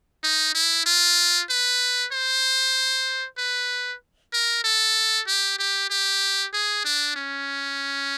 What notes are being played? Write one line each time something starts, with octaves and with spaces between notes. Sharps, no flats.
D#4
E4
F4
B4
C5
B4
A#4
A4
G4
G4
G4
G#4
D4
C#4